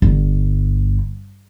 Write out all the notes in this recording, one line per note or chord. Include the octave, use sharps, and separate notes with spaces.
G1